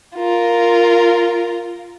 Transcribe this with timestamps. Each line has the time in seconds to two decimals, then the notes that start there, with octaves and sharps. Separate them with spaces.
0.17 F4 A#4